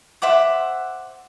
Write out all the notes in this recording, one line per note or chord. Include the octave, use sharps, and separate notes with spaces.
C5 E5 F#5 D6